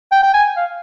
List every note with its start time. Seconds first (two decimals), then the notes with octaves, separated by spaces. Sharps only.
0.12 G5
0.23 G5
0.34 G#5
0.57 F5